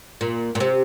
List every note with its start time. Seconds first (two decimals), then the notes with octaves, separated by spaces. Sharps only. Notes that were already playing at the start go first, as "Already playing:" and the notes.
0.21 A#2
0.55 A#2
0.60 C3